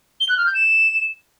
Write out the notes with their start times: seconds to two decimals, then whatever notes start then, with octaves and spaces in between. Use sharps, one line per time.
0.20 G7
0.29 F#6
0.37 F6
0.46 G6
0.55 E7